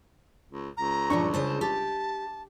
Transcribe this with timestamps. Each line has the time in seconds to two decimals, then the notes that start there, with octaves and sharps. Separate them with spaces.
0.50 C#2
0.77 C#2 A#5
1.10 G2 A#2 F3 D4 C#6
1.34 C#3 C5 A5
1.61 G4 A5